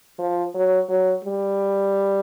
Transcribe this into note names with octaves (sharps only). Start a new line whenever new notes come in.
F3
F#3
F#3
G3